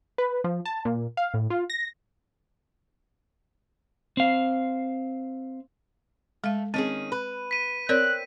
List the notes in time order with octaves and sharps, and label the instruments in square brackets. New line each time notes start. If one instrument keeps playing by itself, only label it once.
[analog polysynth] B4
F3
A5
A#2
F5
A2
F4
A#6
[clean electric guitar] C4 F5
[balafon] G#3 F5 [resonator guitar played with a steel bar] A3
[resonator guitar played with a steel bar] D#3 C#4 G#4 [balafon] C4 [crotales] D#7
[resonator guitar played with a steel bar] B4
[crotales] B6 D#7
[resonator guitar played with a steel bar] C4 [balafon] A#4 C#5 D5 [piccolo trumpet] F#6